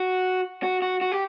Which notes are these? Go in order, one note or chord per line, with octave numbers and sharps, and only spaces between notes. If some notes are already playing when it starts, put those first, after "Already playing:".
Already playing: F#4
F#4
F#4
F#4
G4